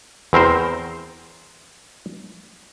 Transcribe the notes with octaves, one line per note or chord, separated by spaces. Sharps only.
E2 C4 A#4 C5